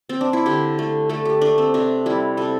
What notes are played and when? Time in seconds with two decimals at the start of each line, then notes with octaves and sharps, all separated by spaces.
0.09 C4
0.21 D4
0.33 E4
0.46 D3 G4
0.79 A3
1.09 A3 A4
1.25 G4
1.41 A3 D4
1.58 C4
1.74 C3 D4
2.06 G3 E4
2.37 C3 A4